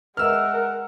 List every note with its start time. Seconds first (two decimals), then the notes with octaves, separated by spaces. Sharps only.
0.17 G#3 A#4 B4 D#5 E5 F#5 E6 F6